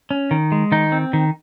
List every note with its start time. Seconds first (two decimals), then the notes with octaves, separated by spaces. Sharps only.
0.11 C#4
0.31 D#3
0.52 G#3
0.72 D#3 D#4
0.92 C4
1.13 D#3